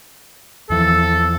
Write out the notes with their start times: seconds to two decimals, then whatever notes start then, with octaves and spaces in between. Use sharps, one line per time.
0.70 E2 E3 F3 A4